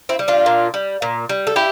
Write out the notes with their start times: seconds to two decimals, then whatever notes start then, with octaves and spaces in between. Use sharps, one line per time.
0.09 C4 E4
0.19 G3
0.28 D4 F4
0.46 A#2
0.74 G3
1.02 A#2
1.29 G3
1.47 A4
1.56 E4 G4